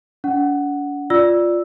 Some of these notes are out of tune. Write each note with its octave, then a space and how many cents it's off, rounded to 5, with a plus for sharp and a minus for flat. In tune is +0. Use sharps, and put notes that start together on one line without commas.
D4 -45 F#5 +0
F4 +0 D5 +0 E6 +0